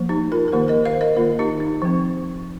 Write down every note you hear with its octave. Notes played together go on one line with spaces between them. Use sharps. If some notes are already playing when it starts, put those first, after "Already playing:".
Already playing: F3 A#3
D#4 G4
F4 A#4
A#4
D#3 A#3 G4 C5
A#4 D#5
C5 F5
A#4 D#5
D#3 A#3 F4 A#4
D#4 G4
D#4
F3 C4